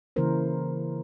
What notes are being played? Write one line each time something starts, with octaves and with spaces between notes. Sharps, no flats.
C#3 E3 A#3 E4 A#4 C5